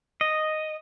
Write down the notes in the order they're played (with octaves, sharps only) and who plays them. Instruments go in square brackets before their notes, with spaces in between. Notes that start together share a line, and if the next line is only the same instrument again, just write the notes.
[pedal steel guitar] D#5